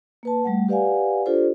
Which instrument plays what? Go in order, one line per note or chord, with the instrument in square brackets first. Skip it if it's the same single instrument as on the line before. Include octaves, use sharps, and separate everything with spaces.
[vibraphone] A#3 B4 A5
G3 A3 F#5
G4 B4 D5 F5 F#5 G#5
D4 F4 G4 A4 C5 D5